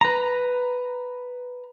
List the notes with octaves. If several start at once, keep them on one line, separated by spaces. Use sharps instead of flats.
B4 A#5